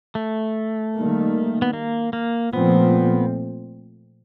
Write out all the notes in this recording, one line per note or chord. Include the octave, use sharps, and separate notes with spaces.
A3
D#3 G3 A#3
B3
A#3
A#3
A#2 F3 A3 B3 C4